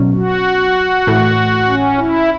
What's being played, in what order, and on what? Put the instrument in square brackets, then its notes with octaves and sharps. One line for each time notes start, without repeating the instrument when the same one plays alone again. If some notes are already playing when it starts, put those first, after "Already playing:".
Already playing: [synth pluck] B2 F#3 C#4
[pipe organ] F#4
[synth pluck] A2 E3 A3
[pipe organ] C#4
E4